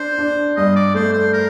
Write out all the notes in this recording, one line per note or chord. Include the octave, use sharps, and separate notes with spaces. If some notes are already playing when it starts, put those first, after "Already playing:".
Already playing: D4 C5
D4
G2 D#5
D5
A3 C5
C5
A#4